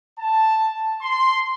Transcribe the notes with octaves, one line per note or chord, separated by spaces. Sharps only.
A5
C6